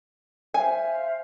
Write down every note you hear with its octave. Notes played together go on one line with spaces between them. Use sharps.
C5 E5 F5 G#5